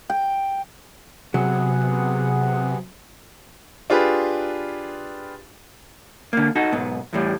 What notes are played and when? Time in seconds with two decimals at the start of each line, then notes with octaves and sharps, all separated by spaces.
0.10 G5
1.34 C3 F#3 B3 G#4 F#5
3.90 D4 F4 G4 G#4 B4
6.33 D3 A#3
6.56 D#4 F#4 A4
6.72 B1 G#2 B3
7.13 E2 A2 G3